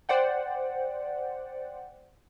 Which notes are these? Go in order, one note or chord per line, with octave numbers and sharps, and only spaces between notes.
C5 D5 F#5 G5